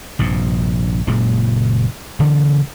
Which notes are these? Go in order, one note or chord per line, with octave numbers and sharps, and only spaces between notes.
A#1 G2 C3
F#1 A#2 C#3 G#3
D2 C#3 E3 A#3